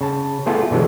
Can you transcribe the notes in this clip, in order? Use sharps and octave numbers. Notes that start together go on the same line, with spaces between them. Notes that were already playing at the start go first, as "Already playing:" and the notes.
C#3 A5
A3 B3 E4 F4 G#4 A4
B2 D3 E3 F#3 G#3